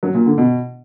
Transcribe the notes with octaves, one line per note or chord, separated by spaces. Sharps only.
F#3
A#2
D3
B2